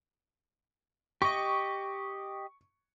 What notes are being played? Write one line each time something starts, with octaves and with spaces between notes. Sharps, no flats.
G4 D#5 C#6